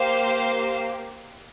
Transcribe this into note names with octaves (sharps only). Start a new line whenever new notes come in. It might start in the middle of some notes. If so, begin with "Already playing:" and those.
Already playing: A#3 G4 C5 F5